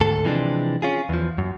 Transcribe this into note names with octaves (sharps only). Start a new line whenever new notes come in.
D2 G#2 A4
C3 E3 F3 G#3 C4 D4
C#4 F4 G#4
E2 F3
F#2